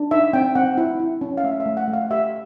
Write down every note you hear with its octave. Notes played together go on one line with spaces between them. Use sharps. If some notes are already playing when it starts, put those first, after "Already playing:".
Already playing: D4
D#4 E5
C4 G5
C4 F#5
E4
E4
C#4
F5
A3 E5
E5
A3
F#5
A3
F5
G4 E5